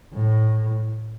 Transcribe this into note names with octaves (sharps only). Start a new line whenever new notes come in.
A2